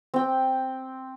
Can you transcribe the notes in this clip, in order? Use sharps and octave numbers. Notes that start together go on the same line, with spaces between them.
C4 G5